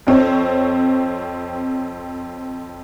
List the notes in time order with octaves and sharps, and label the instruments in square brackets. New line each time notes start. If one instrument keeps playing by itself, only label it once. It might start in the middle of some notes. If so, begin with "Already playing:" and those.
[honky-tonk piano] F2 C4 C#5